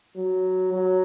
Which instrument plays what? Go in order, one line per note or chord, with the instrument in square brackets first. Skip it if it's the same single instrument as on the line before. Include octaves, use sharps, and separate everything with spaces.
[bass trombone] F#3
F#3